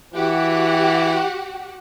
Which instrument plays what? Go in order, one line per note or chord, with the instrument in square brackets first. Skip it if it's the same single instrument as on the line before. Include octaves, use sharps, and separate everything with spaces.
[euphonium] E3 [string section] F#4 G4 F#5